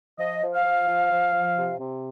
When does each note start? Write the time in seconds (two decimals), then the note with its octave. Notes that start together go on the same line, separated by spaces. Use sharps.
0.19 F3 D#5
0.42 F3
0.53 F5
0.64 F3
0.87 F3
1.11 F3
1.34 F3
1.57 C3
1.80 C3